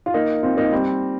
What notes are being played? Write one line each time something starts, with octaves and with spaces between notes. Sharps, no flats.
F4
A#3 D#4
C4 F4
A#3 D#4
G3 C4